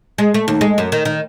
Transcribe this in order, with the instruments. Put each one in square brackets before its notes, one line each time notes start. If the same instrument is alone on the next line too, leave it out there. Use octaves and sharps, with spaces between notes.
[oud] G#3
A3
D#2
G#3
F#2
D#3
D#3